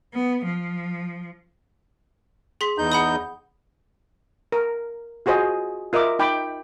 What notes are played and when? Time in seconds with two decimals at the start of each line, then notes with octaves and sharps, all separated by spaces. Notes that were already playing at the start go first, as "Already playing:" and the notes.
0.13 B3
0.44 F3
2.61 G#4 C6 B6
2.78 E2 D#4 G6
2.92 F#5 B5 D#6
4.52 A#4
5.26 F4 F#4 G#4 C5 D#5
5.93 F4 A#4 D#5 E5 D6
6.19 D#4 G5 B5 D6